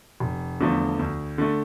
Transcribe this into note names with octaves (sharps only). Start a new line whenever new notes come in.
F1
E2 D3 F3 A3
D2
D3 A3